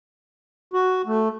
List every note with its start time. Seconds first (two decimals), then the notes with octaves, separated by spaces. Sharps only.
0.74 F#4
1.07 A3